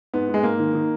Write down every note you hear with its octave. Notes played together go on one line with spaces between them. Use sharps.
G#2 B3
G#2
G#3
G#2 A#3
D#3
D#3